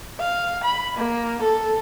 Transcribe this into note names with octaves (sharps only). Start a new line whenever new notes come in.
F5
B5
A#3
A4